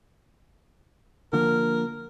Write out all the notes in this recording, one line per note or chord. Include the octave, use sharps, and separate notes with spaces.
D3 F3 A#3 A#4